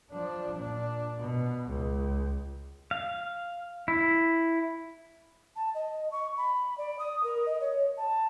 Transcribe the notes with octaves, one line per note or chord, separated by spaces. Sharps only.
F3 D4
A#2 D4
B2
C#2
F5
E4
A5
D#5
C#6
B5
D5
D#6
A#4
D#5
C#5
A5